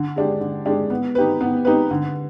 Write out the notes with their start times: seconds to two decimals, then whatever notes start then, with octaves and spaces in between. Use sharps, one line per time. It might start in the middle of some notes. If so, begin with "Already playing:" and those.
Already playing: D3
0.16 G#3 D4 G4
0.41 D3
0.66 G#3 D4 G4
0.90 B3
1.15 D#4 G4 B4
1.41 B3
1.65 D#4 G4 B4
1.91 D3